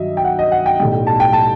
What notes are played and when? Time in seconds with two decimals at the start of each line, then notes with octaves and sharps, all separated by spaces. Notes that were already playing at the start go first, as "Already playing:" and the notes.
Already playing: G2 D#3 F#3 D#5 E5
0.17 G5
0.24 F#5
0.39 D#5
0.52 F#5
0.66 G5
0.80 B1 A2 G3 G5
1.07 A5
1.20 G5
1.33 A5